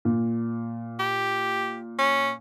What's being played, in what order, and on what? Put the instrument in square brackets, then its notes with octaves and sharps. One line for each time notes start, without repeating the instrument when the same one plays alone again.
[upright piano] A#2
[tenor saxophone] G4
C#4